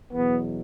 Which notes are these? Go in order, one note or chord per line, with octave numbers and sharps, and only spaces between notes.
E2 B2 F#3 B3